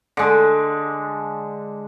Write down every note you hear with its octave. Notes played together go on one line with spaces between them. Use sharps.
D3 G#3